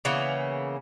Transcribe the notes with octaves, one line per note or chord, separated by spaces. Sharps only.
C#3 E3 A#3 B3